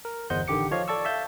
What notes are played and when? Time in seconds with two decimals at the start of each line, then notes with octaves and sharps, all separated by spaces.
0.05 A#4
0.30 G1 E2 C5 D#5 F#5 G6
0.48 A1 D3 D#3 G4 D6 C#7
0.71 F3 C#5 D#5 F5
0.88 A4 D5 A5 C#6 E6
1.05 E5 F5 A5 G6